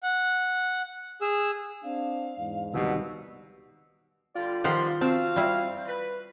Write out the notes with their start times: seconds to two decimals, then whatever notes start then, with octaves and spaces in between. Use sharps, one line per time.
0.03 F#5
1.22 G#4 E6
1.83 C4 D4 F5
2.38 E2 G#2
2.73 C2 B2 D#3 G3 E6
4.35 D3 G3 F4 D5
4.64 D#3 F3 G3 B3 C5 F#5 C6
5.01 C4 F#4 F5 A5
5.36 G3 E4
5.88 B4